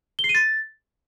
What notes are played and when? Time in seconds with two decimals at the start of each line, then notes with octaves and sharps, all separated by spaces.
0.19 G7
0.24 C7
0.29 D#7
0.35 A6